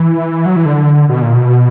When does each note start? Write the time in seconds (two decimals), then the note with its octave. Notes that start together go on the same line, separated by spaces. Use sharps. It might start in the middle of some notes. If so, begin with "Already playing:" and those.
Already playing: E3
0.46 F#3
0.56 E3
0.66 D3
1.09 B2
1.22 A#2
1.35 B2